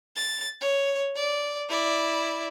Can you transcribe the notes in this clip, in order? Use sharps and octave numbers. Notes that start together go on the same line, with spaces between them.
A6
C#5
D5
E4 D5